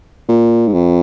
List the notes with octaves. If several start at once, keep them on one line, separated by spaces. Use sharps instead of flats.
A#2
G#2
F2